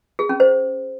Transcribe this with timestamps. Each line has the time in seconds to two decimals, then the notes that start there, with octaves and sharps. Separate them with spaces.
0.19 G#4
0.29 C#4
0.40 C5